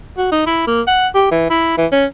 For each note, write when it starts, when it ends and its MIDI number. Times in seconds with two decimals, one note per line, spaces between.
0.18 0.30 66
0.32 0.46 63
0.47 0.66 64
0.67 0.82 58
0.87 1.08 78
1.15 1.28 67
1.31 1.47 52
1.50 1.76 64
1.78 1.86 52
1.92 2.05 61